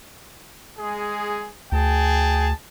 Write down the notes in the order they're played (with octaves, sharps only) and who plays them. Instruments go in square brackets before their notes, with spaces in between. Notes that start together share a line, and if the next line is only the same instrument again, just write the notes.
[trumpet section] G#3 G#4
[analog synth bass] D2 [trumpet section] G#4 G5 A5